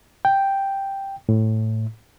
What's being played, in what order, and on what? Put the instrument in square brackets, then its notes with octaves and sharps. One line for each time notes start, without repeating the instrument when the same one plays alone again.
[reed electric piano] G5
A2